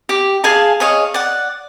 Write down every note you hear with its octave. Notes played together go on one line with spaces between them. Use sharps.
G4
G#4 F5 G#5 A5
G#4 C#5 D#5 F5
D5 F#5